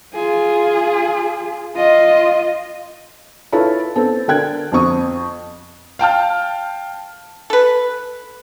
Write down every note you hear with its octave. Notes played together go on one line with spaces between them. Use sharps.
F4 G#4
F4 D#5
E4 F4 A4 B4 C#5 B5
B3 C4 A4
D3 A4 A#4 G5 F#6 G#6
F2 C4 C#6 D#6
F5 G5 A5 F6
A4 B4